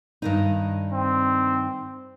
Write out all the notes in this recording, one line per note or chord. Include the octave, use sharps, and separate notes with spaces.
G2 D#3 D#4
C4